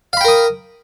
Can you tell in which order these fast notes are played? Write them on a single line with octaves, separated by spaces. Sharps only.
F5 B5 G5 A#4 D#6